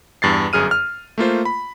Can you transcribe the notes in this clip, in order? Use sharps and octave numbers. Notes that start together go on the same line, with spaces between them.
E2 G2 A6 C7
G1 F#2 G#4 F6 D#7
F6
A3 A#3 F4 C5
B5